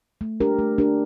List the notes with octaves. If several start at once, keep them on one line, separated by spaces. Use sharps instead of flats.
A3
D4 G4 A#4
A3
D4 G4 A#4